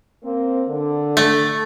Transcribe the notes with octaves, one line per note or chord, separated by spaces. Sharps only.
A#3 C4
D3
A3